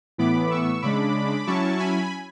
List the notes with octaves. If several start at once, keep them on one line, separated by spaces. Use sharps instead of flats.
A2 E3 B3 B5 D6
C#6 E6
C#3 G#3 D4 B5 D6
F#3 C#4 E4 A5 C#6
G#5 B5